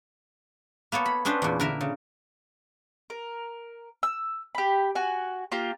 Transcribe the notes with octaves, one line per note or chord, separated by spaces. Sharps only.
A#3 B3 A4 C#5
B5
B3 C#4 D4 B4 C5
E2 A#2
D3 A#4 E5
C#3
A#4
E6
G4 B5
F#4 G#5
A#3 F4 G4